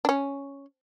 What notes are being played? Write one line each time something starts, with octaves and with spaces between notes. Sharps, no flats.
D4
C#4